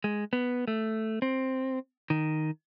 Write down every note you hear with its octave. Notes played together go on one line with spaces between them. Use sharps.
G#3
B3
A3
C4
D#3